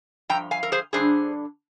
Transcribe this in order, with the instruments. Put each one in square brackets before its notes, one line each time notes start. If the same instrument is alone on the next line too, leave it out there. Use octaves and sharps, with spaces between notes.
[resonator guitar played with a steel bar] G2 F3 G5 A#5
F5 G#5
A#4
G#4 C5
G2 D3 G3 D4 G#4 C5